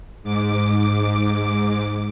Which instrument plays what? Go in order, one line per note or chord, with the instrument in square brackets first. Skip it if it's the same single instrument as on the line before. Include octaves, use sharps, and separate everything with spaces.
[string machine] G#2 D6